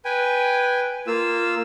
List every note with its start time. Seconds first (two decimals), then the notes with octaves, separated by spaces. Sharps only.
0.05 B4 G5 G#5
1.07 A#3 F4 E6